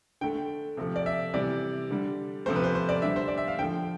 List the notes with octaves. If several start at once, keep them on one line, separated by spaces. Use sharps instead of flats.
D3 A3 G5
C3 F3 A3
D5
E5
C3 E3 G3 D5
D3 G3
C3 F3 A3 C5
B4
C5
C5
D5
D3 G3 E5
C5
D5
E5
F5
D3 F3 A3 G5